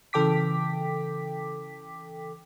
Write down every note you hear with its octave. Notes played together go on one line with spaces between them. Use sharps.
C#3 E3 A4 G5 D6 B6